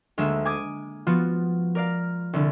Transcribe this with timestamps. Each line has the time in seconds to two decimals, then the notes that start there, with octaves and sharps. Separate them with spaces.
0.18 D2 G#3 A#3 E5
0.45 G#5 D6 D#6 G#6
1.07 F3 B3 F4 F#4
1.75 A#4 D5 F5
2.33 C2 D3